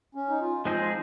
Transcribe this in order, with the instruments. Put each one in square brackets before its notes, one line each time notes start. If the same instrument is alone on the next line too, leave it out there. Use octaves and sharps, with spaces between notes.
[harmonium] C#4
D#4
F4
[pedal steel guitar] F3 G#3 C4 D#4 G#4 [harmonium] F4